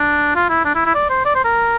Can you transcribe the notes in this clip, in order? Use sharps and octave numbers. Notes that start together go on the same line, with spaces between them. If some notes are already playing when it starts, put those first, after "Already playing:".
Already playing: D4
F4
E4
D4
E4
E4
D5
C5
D5
C5
A#4